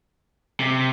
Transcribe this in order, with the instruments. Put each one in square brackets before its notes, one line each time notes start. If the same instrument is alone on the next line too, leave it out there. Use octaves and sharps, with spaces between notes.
[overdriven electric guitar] C3